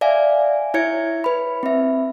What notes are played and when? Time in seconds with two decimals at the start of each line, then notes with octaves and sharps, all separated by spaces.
0.01 D5 E5 F5 G#5
0.74 E4 C#5 E5 G#6 C#7
1.24 B4 B5
1.63 C4 E5